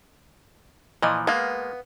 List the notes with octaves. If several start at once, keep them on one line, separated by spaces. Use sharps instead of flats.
A#2 E3 F3 D#5
G#3 A#3 B3 F5